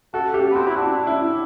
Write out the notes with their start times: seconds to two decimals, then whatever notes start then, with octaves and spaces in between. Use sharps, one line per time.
0.14 F#4 A4
0.34 G4
0.51 B3
0.55 C4 F#4
0.67 E4
0.76 D4 F#4
1.07 E4